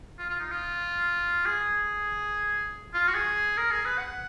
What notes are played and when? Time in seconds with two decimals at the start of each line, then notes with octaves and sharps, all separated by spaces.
0.19 F4
0.29 F4
0.40 D#4
0.51 F4
1.46 G#4
2.94 F4
3.08 F#4
3.14 G#4
3.57 A#4
3.70 G#4
3.85 B4
3.98 F#5